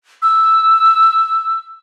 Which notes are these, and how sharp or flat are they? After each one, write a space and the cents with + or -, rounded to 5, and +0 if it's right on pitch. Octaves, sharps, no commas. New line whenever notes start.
E6 +0